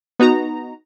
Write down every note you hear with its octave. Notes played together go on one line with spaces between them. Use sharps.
B3 D#4 F#4 A#5